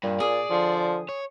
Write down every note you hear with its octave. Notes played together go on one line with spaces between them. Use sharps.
G2 A#2
G#4 D5
D3 F3
C#5